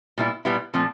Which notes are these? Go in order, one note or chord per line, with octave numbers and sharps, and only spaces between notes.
A#2 G3 B3 E4
A#2 G3 B3 E4
A#2 F3 A3 C4